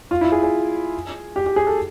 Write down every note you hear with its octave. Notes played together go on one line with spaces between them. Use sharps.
F4
E4
G#4
G#4
G4
G4
G#4
A4